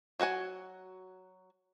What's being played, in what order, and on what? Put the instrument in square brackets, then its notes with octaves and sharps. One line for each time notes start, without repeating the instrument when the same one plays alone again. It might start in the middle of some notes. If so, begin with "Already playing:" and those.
[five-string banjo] F#3 F#4 F#5 G#5